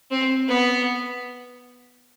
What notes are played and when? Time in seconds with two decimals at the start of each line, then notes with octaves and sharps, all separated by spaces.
0.11 C4
0.48 B3